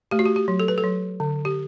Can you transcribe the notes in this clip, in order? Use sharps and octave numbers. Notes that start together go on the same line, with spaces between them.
A3 G4
F#4
G4
G4
F#3
A4
B4
A4
F#3
D3
G4